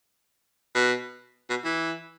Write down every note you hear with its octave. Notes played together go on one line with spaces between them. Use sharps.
B2
B2
E3